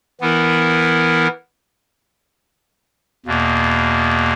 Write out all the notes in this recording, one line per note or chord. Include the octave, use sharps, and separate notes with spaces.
E3 B3 E4 A#4
E2 B2 A#3